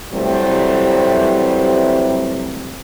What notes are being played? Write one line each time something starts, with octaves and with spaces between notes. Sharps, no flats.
C3 E3 F#3 G3 A3 C4